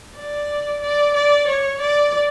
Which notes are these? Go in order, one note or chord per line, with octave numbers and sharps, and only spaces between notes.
D5
D5
D5
C#5
D5